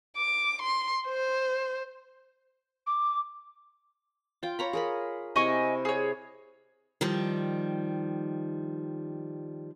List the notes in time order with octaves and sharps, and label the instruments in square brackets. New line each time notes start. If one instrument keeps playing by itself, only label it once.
[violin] D6
C6
C5
[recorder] D6
[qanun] F4 G5
C#5 A#5 B5
G#4 A#4 B5
[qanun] C3 E4 [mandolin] D#5 G#5 C#6
[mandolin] G#4 C#5
[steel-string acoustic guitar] D#3 F3 G3